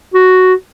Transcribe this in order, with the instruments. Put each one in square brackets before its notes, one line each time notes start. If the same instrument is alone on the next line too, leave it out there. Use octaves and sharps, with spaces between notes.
[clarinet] F#4